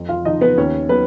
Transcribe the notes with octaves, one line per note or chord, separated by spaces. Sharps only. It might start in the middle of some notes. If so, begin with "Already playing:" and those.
Already playing: F2
F4 F5
F3 D#4 D#5
B3 B4
D#2 C#4 C#5
F#3 B3 B4